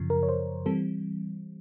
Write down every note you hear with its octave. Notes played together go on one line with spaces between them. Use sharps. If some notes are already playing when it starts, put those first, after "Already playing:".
Already playing: F#2 C#3 F3
A#4
C#5
C5
E3 G3 C4 A4